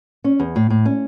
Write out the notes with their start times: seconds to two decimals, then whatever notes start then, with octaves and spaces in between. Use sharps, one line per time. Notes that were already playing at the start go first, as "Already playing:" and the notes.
0.24 C#4
0.39 E2
0.56 A2
0.70 A2
0.86 C#4